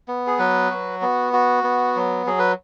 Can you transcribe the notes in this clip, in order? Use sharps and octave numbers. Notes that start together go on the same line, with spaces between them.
B3
G#4
F#3 B4
F#4
B3
F#4
B3
F#3
F#3 G#4
B4